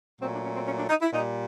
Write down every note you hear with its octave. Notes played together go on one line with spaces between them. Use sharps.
A#2 F#3 A3 C4
D4
C#4
C4
C#4
D4
D#4
E4
A#2 G3 D#4